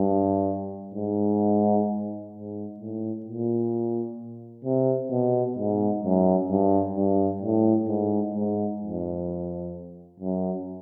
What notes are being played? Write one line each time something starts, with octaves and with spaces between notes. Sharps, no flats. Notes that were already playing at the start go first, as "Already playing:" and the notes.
Already playing: G2
G#2
G#2
A2
A#2
C3
B2
G#2
F#2
G2
G2
A2
G#2
G#2
F2
F#2